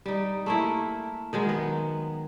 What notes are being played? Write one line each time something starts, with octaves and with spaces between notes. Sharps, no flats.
G3 D#4
A3 A#3 E4
D#3 F#3 G#3
B3